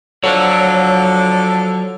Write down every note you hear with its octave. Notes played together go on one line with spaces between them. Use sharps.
D3 F3 F#3 C#5